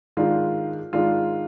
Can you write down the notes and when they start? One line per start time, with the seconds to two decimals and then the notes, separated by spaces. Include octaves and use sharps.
0.17 G#2 D#3 G#3 D4 F4
0.93 G#2 D#3 G#3 D4 F4